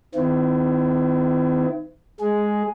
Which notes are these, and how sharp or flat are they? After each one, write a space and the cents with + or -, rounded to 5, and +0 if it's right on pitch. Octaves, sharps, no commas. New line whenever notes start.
D#3 +0 C4 -45 E4 +25
G#3 +0 G#4 +5